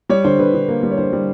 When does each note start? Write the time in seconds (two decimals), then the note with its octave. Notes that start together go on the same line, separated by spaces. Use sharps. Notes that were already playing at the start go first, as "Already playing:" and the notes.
0.09 G3 C#5
0.24 D3 C5
0.39 D3 B4
0.54 D3
0.69 A#3
0.83 G3
0.91 C#5
0.98 D3 C5
1.13 G3